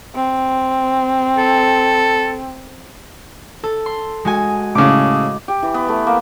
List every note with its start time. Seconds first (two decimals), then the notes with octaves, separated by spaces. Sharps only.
0.16 C4
1.38 A4
3.64 A4
3.86 C6
4.25 G#3 F#4 G#5
4.75 A2 C#3 G#3 D6
5.48 G4
5.63 E3
5.74 B3
5.89 A3
6.07 A#3